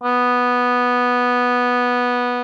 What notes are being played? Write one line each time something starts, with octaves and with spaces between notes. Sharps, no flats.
B3